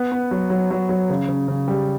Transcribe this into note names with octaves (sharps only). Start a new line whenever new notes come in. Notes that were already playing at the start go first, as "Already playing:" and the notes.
Already playing: B3
B3
F#3
F#3
F#3
F#3
C#3
C#3
C#3
G3